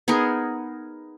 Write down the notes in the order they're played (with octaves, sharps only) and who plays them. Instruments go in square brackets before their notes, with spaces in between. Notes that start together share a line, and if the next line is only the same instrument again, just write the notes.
[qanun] B3 D#4 G#4 A#4